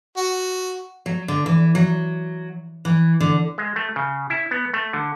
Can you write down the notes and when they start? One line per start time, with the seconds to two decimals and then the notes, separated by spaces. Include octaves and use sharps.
0.17 F#4
1.06 F#3
1.28 D3
1.46 E3
1.75 F#3
2.85 E3
3.20 D3
3.58 G#3
3.76 A3
3.96 C#3
4.30 E4
4.51 B3
4.74 A3
4.93 D3